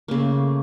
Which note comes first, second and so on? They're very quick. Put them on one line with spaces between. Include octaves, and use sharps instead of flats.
A#3 C#3 A3